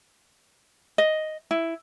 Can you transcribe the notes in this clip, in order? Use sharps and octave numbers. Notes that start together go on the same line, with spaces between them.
D#5
E4